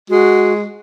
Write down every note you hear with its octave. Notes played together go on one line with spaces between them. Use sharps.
G#3 F#4